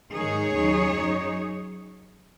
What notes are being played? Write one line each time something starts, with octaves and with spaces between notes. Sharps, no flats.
G#2 D#3 G#3 D#4 G#4 C#5
D#2 C#3 F#3 D#4
F#2 F#3 D#4